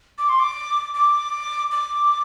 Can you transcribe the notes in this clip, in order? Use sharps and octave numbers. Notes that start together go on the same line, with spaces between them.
D6
C6
D6
D6
D6